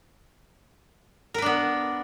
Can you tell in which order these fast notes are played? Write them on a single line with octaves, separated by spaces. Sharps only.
A#4 B4 D4 B3